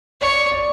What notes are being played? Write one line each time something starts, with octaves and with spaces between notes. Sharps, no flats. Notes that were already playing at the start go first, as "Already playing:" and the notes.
C#5 D5
D5